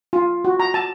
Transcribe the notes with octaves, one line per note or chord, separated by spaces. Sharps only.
F4
F#4
A#5
A5